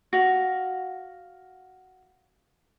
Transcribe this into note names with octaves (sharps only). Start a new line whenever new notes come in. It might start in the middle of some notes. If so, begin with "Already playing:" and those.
F#4 F5